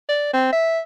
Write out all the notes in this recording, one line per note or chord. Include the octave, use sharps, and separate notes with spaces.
D5
C4
E5